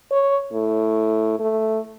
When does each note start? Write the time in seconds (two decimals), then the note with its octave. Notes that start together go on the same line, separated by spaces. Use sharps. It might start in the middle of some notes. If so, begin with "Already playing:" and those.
0.11 C#5
0.52 A2
1.39 A3